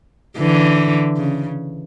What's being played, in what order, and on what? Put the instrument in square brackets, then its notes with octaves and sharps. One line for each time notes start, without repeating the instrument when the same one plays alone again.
[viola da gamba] D3 E3
C#3